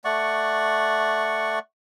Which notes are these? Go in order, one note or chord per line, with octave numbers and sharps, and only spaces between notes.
A3 D5 F#5 C#6